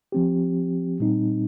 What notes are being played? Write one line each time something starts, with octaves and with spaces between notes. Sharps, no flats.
F3 C4 G4
A#2 G3 C4 D#4